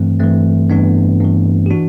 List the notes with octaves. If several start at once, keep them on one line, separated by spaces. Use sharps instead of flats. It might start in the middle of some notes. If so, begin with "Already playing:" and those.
Already playing: G2 E3 A3 C4
G2 E3 A3 C4
G2 E3 B3 D4
G2 E3
G4
E3 D4 F#4